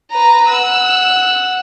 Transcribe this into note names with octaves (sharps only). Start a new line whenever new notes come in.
B4 A#5
F#5 E6